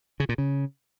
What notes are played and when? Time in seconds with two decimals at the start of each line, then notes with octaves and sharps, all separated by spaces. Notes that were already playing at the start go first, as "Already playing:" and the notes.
0.20 C#3
0.29 A#2
0.38 C#3